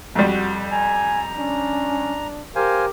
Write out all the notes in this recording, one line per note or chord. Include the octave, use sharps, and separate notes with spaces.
F2 G3 F#4
G#5 A#5
C#4 D4
G4 A#4 C5 F5 G#5